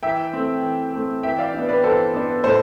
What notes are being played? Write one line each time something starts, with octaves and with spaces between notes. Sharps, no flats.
E3 E5 G5
A3 C4
E3
A3 C4
E3 E5 G5
D5 F5
B3 D4
B4 D5
E3 A4 C5
B3 D4
A2 A4 C5